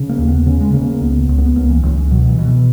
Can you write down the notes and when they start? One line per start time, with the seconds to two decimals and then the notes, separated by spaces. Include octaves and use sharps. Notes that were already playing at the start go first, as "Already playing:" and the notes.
Already playing: C#3
0.09 A#3
0.18 D#2
0.28 B3
0.46 C#3 C#4
0.61 G#3
0.74 C#3 A#3
0.88 A#3
1.01 C#2 B3
1.29 C#2
1.38 B3
1.55 C#2 A#3
1.70 E3
1.83 C#2 E3
1.98 E3
2.11 B2 F#3
2.29 E3
2.39 B2
2.48 E3